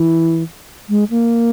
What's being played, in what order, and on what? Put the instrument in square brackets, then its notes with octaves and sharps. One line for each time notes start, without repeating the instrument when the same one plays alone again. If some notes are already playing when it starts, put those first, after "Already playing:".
Already playing: [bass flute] E3
G#3
A#3